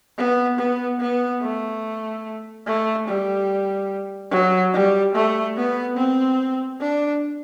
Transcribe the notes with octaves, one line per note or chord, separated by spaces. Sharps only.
B3
B3
B3
A3
A3
G3
F#3
G3
A3
B3
C4
D4